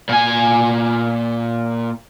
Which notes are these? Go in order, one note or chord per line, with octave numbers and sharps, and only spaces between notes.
A#2 G#5